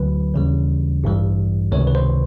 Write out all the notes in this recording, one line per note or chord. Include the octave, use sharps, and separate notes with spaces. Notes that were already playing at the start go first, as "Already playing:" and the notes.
Already playing: D2 D3 F#3 B4
D#2 C#3 E3 G3
A1 G2 E3 G3
C#2 C3 D#3 C#5
B4
C5